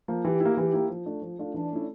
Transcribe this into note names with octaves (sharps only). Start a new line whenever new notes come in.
F3 A#3
E3 G4
A#3 E4
E3 G4
A#3 E4
F3
A3 D4 F4
F3
A3 D4 F4
E3 D4
A3 C#4 E4